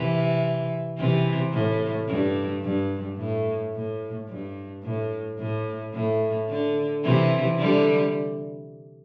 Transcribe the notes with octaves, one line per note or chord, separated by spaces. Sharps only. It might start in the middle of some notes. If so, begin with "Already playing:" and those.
Already playing: C3 E3
C3 E3
A2
G2
G2
A2
A2
G2
A2
A2
A2
D3
C3 E3
D3 G3